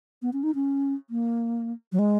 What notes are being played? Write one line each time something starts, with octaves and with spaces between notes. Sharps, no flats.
B3
C#4
D#4
C#4
A#3
F#3
G#3